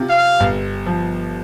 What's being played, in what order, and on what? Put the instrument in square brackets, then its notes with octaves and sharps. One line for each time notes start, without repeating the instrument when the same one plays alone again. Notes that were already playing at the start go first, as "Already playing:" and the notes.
Already playing: [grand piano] C3 F4
[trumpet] F5
[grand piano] G1
F3